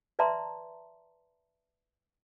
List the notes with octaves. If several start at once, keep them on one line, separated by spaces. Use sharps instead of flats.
B4 D5 E5 A5 A#5 C6